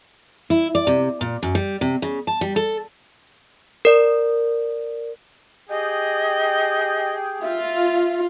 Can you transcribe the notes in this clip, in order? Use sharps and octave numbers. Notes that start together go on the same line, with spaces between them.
E4
D5
C3
A#2
F#2
G3
C3
C#3
A5
G3
A4
A#4 D5
G4 G#4 D#5 G5
F4 E5